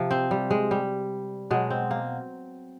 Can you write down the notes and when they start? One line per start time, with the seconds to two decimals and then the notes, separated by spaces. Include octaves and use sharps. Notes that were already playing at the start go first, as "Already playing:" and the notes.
Already playing: C3 F3
0.11 C4
0.31 G3
0.50 G#3
0.71 G3
1.50 B2 F#3 G#3
1.70 C4
1.91 A#3